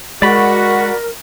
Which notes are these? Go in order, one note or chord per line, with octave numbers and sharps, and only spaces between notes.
G#3 F#4 A#4 D5 B5